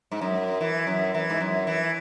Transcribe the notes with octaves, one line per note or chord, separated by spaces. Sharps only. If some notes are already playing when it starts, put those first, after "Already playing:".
G#2
F#2
E3
F#2
E3
G#2
F#2
E3